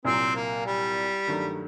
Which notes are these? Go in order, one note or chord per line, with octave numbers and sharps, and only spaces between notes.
C2 A#2 F#3 C4
A#3
G3
G2 D#3 F#3 A3